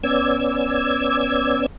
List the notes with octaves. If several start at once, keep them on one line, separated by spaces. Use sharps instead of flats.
B3 C#4 D5 E6 G#6